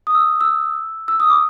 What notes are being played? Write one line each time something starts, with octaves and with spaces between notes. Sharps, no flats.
D#6
E6
E6
E6
D#6
D6